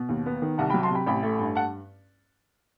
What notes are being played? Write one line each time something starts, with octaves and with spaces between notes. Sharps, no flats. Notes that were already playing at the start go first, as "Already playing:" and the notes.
Already playing: B2
D#2
B3
D#3
C2 F#5 A5
G5 B5
F#3
A5 C6
C3 G5 B5
A1 G5 B5
A3
G2
F#5 A5